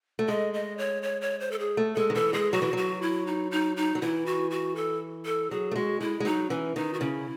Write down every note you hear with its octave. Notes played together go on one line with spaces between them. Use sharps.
A3
G#3 D#5
D#5
C#5
C#5
C#5
C5
A4
G#4
A3
G#3 A4
D#3
E3 A4
G#3 G#4
F#3 F#4
E3
F#3 F#4
E4
D#4
D#4
D#4
F#3
E3 E4
F#4
F#4
A4
A4
F#3 G#4
A3
G#3 F#4
G#3 E4
G#3
F#3 D#4
E3 C#4
D#3 D#4
F#4
C#3 E4